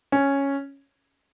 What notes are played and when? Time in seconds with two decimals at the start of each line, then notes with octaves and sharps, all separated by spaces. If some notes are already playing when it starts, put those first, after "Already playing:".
0.12 C#4